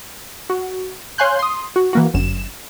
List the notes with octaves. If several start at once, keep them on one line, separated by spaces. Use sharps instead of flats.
F#4
C#5 F5 G#5 C6 F#6 G6
C6 D#6
F#4
E3 A#3 F#4
G1 F#2 E7